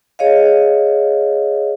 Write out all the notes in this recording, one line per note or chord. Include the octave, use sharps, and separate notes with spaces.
G#4 C#5 D#5 F5